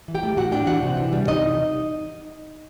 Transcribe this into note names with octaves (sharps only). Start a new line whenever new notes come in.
E3
G4 G5
A3
A2 F#4 F#5
D4 G4 G5
E3 F#4 F#5
C3
E3
G3
C3 D#4 D#5